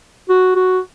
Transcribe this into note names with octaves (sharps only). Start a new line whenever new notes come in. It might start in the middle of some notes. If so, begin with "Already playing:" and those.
F#4
F#4